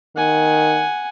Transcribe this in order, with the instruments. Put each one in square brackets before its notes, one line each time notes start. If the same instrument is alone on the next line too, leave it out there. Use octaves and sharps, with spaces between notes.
[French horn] D#3 [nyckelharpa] F#5 G#5